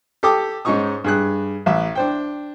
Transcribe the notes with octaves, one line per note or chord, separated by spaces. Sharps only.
G4 A4 G5 D6 D#6
G#2 G#3 C#4 D#4 C#6 D#6
G2 G#4 F#6
A1 E5
D4 C5 G5